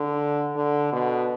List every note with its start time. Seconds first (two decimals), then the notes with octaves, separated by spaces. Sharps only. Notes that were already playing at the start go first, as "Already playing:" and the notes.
Already playing: D3
0.55 D3
0.92 B2